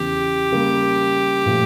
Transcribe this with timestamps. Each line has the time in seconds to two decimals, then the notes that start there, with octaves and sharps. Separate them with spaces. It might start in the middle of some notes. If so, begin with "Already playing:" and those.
Already playing: E2 C#3 E3 G4
0.52 C#3 G3 A#3
1.46 A#2 F3 A3